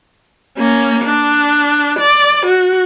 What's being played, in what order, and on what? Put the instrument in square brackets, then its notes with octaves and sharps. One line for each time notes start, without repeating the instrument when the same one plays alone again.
[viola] A#3 C#4
D4
D5
F#4